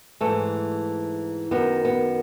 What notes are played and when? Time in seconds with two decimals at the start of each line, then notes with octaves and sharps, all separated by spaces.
0.21 G#2 E3 A3
1.51 F#2 D#3 B3
1.85 B3